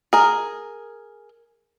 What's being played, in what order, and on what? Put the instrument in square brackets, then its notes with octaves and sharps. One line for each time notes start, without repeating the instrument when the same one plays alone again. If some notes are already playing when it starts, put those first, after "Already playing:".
[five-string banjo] G#4 A#4